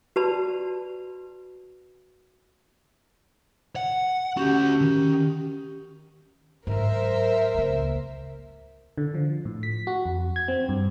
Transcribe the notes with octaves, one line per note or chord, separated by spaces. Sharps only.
F#4 B4 D5 A5 B5
F#5
D2 C#4 F#4 G4
D#3
G#2 F#3 A#4 C5 E5
C#2 A#3
D3
F3
A2
B6
F#4
F2
G#6
C4
G2